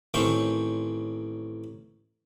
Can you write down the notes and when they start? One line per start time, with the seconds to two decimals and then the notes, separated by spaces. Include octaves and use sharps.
0.14 A1 D#3 C4 C#4 C5 C#6